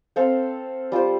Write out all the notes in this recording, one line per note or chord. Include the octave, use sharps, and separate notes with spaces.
C4 A4 C5 F5
G3 F4 C5